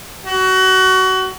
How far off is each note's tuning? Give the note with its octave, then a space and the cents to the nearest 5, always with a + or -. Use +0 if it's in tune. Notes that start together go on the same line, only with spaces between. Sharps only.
F#4 +25